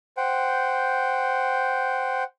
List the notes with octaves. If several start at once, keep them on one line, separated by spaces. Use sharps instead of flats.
C5 F#5 G5